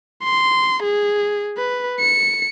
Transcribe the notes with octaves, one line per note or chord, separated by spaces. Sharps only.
C6
G#4
B4
C#7